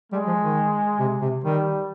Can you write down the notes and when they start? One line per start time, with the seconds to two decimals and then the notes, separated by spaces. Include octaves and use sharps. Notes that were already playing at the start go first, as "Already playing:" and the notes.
0.12 G3 G#3
0.27 F3
0.42 D#3
0.99 C3
1.21 C3
1.43 D#3 G3